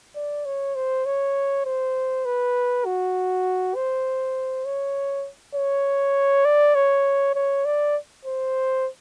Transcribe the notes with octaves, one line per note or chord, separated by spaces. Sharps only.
D5
C#5
C5
C#5
C5
B4
F#4
C5
C#5
C#5
D5
C#5
C#5
D5
C5